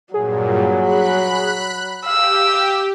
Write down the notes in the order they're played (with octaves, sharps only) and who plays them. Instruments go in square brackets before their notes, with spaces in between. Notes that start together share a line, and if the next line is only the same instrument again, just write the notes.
[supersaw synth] G2 A#2 [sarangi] F#3 [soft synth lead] G#4
[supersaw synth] B5 F#6
[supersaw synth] G4 [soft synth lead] F5 [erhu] E6